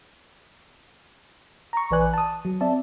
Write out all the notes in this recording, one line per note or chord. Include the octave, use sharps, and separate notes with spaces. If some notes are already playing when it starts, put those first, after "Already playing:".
A#5 C#6
A#1 E3 B4 D5 G#5 F#6
A5 D#6
F#3
C4 D5 E5 A5